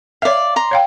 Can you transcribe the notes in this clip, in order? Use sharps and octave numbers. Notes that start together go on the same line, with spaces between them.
C#5 D5 E5 F5
A#5 C6
C#5 F5 G5